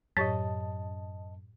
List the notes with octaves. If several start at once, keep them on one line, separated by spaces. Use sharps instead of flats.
F#2 A2 G4 C#5 D#5 A5 A6 B6